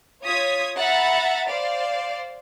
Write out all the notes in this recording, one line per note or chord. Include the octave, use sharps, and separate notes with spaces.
F4 C#5 D#6 G#6 B6
E5 F#5 A#5 B5 A6
C5 D5 F5